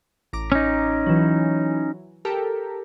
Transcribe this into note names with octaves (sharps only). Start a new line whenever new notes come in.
A1 A#5 D6
C#4 D#4
E3 F#3
G4 A4 A#4